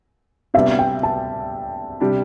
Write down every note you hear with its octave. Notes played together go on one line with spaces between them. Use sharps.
C3 G3 B3 D4 E5
G5
A5
C3 G3 D4 G4